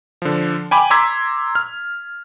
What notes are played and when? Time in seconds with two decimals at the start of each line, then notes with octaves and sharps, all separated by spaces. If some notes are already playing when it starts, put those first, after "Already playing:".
0.22 D3 F3
0.71 G5 G#5 B5 D6
0.90 A#5 C6 D6 E6 G#6 B6
1.55 F6